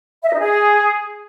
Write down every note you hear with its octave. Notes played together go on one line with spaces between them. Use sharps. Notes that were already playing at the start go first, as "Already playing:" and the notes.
E5
D#5
D#4
G#4